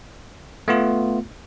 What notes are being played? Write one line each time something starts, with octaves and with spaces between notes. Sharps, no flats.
A3 B3 F4